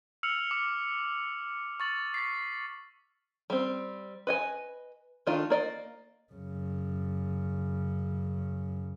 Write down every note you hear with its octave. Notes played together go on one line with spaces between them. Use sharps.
E6 F6 C#7 F7 F#7
D6
C#6 A6 F#7
A6 B6 C7
G3 C4
B4 D#5 G#5
D#3 A3 D4 D#4 F4
A#3 D5 D#5
F#2 C#3